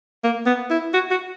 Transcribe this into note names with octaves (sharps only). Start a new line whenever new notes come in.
A#3
B3
E4
F#4
F#4